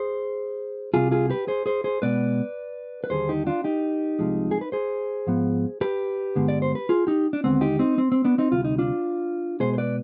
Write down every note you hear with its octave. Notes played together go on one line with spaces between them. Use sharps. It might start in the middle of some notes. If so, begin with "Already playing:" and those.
Already playing: G#4 C5
C2 C3 G3 F4 G#4
F4 G#4
G4 B4
G#4 C5
G#4 C5
G#4 C5
B2 G#3 B3 B4 D5
B4
D#2 D3 G3 G#4 C5
D#4 G4
D4 F4
D#4 G4
C2 C3 F3 G#3
G#4
B4
G#4 C5
G#2 F3 B3
G4 B4
G2 D3 G#3 B3
D5
C5
B4
F4 G#4
D#4 G4
D4
D#2 D3 G#3 B3 C4
D#4 G4
C4 D#4
C4
C4
B3 D4
C4 D#4
D2 C3 G3 F4
D#4
D4 F4
B2 G#3 B3 G#4 C5
C5
B4 D5